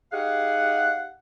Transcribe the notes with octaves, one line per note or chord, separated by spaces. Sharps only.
D#4 G4 G#4 F5 F#5